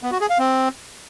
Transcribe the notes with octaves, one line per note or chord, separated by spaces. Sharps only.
B3
F#4
G#4
F5
C4